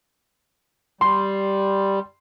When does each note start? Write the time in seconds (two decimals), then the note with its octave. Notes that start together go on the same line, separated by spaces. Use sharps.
1.01 G3 C6